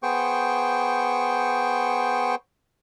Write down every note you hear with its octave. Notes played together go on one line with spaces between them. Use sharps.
B3 G#4 C5 G5 C#6